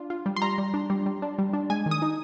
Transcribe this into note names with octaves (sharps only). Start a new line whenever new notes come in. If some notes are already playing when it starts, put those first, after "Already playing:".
Already playing: D4 F4
F4
G3
C6
G3 A#5
G3
D4
G3
G3
D4
G3
D4
G#3 G#5
D#3
D#6
D#4